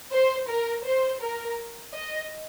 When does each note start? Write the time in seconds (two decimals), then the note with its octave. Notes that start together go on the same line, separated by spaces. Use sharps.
0.12 C5
0.48 A#4
0.85 C5
1.22 A#4
1.93 D#5